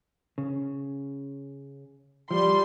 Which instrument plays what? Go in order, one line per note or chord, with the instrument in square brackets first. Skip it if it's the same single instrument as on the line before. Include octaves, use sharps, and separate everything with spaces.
[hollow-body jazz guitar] C#3
[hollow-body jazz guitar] F3 [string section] G3 C6